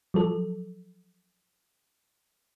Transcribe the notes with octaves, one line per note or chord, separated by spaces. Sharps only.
F3 F#3 A4